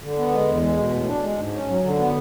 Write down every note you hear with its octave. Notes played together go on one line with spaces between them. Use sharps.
D3
B3
G#3
E2
G#3
B2
A2
D4
G#3
G#2
C#4
F#3
D3
B3